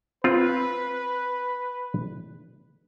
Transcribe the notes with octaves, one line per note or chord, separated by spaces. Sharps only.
C4 F4 B4